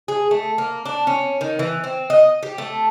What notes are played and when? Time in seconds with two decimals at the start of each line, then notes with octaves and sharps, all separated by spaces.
0.08 G#4
0.31 A3
0.58 A#3
0.85 D4
1.07 C#4
1.41 D#3
1.59 E3
1.84 C4
2.10 D#5
2.43 G4
2.58 A3